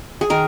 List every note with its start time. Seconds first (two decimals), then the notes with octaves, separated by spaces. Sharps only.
0.21 G#4
0.30 D#3 A#4